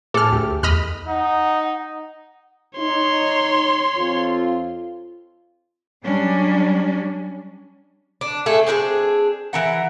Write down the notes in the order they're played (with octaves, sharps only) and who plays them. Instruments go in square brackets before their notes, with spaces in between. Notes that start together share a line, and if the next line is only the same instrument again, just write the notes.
[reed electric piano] A2 G#5 A5 [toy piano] G#4 [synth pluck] A4 F6
[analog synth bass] D2 [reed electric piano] A3 G4
[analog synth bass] E2 [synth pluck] D#5 B5 F6
[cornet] D#4 [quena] F#5
[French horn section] D#4 [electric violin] C#5 C6
[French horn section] F2 C4 F4
[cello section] F#3 G3 C#4 D4
[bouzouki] D4
A3 G#4 A4
C4 D4 F#4 G#4
E3 A#4 F#5